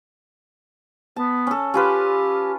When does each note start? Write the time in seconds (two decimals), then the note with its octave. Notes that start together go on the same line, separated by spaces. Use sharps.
1.16 B3 A5
1.47 C#4 A4
1.74 C#4 F4 G4 B4